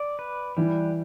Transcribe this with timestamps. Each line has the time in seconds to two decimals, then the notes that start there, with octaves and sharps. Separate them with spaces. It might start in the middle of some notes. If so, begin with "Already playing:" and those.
Already playing: D5
0.19 B4
0.57 E3 G3